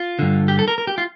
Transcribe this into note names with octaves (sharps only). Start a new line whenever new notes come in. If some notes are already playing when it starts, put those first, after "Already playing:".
Already playing: F4
G2 D3
G4
A4
A#4
A#4
G4
F4